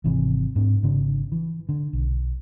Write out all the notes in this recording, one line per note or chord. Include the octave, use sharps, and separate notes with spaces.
G#1 C3 E3
G#2 C4 D4
G#1 C#3 D4
E3
D3
B1